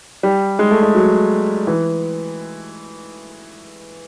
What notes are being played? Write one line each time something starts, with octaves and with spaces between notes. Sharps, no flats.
G3
G#3
A3
G#3
F#3
E3